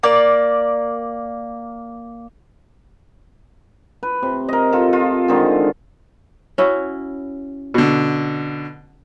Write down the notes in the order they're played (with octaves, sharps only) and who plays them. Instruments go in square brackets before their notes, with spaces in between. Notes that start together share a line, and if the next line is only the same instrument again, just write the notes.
[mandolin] A#3 D5
[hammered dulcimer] B4
C3
A#4 D#5
F4 A4
F4
D3 D#3 G#3 C4
[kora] C#4 E4 F#4
[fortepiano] B2 D3